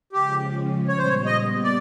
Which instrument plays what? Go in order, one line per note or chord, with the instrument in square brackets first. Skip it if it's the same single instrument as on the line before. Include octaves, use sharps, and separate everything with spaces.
[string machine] C#3 F3 G#3 C#4 [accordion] G4
[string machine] A#2 G3 B3 [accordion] C#5
[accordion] C5
C#5
D#5
D5